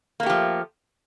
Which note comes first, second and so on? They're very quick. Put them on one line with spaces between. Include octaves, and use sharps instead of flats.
A#3 A3 G4 F3